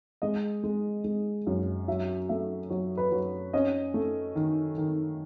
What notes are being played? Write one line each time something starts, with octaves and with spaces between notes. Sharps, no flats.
G#3 D#5
G#3
G#3
F#2
F#3 E5
A3 E5
F#3 C#5
B4
F#3
C#4 D#5
A3
D#3
D#3